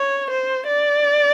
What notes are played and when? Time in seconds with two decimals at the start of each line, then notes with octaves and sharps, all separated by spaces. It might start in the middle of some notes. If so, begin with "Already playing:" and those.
Already playing: C#5
0.30 C5
0.67 D5